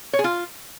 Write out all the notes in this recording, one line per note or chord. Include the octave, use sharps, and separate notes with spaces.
C#5
G#4
F4